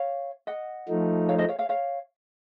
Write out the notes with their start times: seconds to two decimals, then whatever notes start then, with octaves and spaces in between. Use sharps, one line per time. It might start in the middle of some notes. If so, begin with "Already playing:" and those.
Already playing: C#5 F5
0.47 D#5 F#5
0.88 F3 A3 D#4
1.29 C#5 F5
1.38 C5 D#5
1.48 C#5 F5
1.59 C#5 F5
1.69 C#5 F5